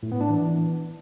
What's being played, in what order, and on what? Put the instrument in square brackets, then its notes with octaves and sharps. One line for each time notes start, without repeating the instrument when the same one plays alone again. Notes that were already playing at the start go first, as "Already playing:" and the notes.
[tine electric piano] A2
B3
D4
E3